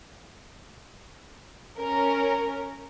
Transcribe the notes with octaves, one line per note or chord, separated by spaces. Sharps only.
C#4 A#4